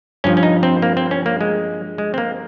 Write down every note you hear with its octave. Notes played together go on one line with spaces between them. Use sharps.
G2 F3 C#4
C#4
D#4
C4
A#3
C4
C#4
A#3
G#3
G#3
C4
A#3